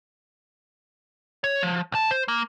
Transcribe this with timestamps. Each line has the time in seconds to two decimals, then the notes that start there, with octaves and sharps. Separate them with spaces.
1.44 C#5
1.63 F3
1.92 B1 A5
2.11 C5
2.28 A#3